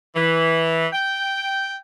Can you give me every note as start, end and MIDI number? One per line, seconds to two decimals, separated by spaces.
0.15 0.85 52
0.92 1.75 79